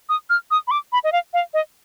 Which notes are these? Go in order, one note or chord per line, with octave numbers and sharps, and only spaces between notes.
D#6
F6
D#6
B5
D6
B5
D#5
F5
F5
D#5